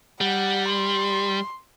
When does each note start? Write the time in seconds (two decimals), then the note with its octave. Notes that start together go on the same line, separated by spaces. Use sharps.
0.21 G3 F#5
0.69 C6